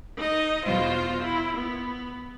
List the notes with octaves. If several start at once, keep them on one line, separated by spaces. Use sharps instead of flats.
D#4 D#5
E2 B2 F4 C5 G6
E4
B3